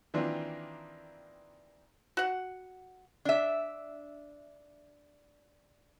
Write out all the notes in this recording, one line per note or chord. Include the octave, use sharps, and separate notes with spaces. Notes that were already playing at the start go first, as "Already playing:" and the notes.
D#3 E3 A#3 C4 D4 F4
F#4 F#5
D4 E5